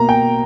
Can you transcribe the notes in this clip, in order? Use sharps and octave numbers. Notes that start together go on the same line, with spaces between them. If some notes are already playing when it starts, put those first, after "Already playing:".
Already playing: B2 A#3 A#5
G5